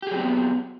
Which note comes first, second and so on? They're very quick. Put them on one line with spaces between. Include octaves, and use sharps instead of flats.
G4 G#4 F#3 C4 B3